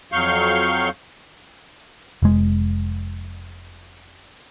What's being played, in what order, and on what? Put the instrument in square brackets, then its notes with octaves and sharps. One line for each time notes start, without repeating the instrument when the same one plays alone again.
[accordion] F2 F#3 F5 C#6 G6
[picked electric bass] F1 G#3